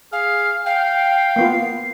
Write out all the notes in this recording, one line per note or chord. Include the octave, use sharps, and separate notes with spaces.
G#4 F5 F6
F5 G5
A#3 B3 F4 C7